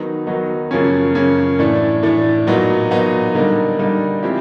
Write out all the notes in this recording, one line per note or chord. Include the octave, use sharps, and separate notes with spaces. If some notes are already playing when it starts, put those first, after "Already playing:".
Already playing: D#3 F#3 B3 D#4
D#3 F#3 B3 D#4
F#2 C#3 F3 A#3 C#4
F#2 C#3 F3 A#3 C#4
A2 E3 A3 D4
A2 E3 A3 D4
A#2 F#3 B3 D#4
A#2 F#3 B3 D#4
D3 G3 A#3 D#4
D3 G3 A#3 D#4
F3 G#3 C4 E4 G4